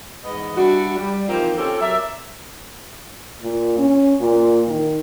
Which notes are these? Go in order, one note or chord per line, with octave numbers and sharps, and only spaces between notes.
E2 G#2 B3 D#5
G3 D4 E4 F#4
G3
E3 F3 A#3 C4 D#4 F4
C4 C#4 F4 G4 A4
F#3 A#4 D5 E5
A#2
C#4
A#2
D#3